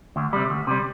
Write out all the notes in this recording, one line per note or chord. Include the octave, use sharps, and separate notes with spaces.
D2
C3 G3
D2
C3 G3